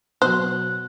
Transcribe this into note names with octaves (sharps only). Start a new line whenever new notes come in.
B2 F#3 C5 F#6